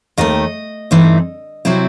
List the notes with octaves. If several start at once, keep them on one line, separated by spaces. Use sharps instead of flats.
D#2 D#3 A3 D#5
G2 E3 A3 C4 D#4
C3 F#3 C4 E4